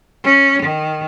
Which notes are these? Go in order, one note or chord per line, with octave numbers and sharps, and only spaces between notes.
C#4
D#3